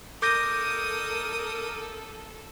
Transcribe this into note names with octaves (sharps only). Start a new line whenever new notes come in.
A4 A#4 D6 D#6 G6 A#6